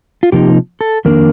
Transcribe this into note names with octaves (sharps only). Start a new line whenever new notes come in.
F4
C3 F3 A#3 D#4 G4
A4
F2 D#3 A#3 D4 A#4